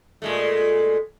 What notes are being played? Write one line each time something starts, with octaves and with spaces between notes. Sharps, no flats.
A#2 G#3 A3